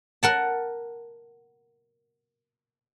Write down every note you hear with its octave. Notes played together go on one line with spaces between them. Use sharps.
A#4 F#5 A5